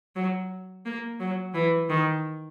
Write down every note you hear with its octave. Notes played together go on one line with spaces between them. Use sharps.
F#3
A#3
F#3
E3
D#3